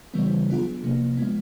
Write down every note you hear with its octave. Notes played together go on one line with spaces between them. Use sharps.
C#3 E3 G3 B3
F#3 B3 D4 F4 G#4
C3 F3 A#3
F3 G#3 B3